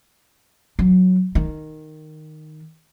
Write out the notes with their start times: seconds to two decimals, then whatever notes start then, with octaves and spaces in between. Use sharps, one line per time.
0.79 F#3
1.35 D#3